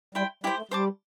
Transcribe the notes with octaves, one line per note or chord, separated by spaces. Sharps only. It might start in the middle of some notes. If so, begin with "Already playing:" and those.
G3 E4 C5 G5
G3 E4 G4 C5
A3
G3 C5 A5 D6